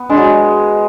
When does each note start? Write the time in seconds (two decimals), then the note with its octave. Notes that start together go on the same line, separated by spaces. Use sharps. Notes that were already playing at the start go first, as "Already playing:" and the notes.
Already playing: B3
0.10 G#3 D4
0.17 F#3
0.24 G#3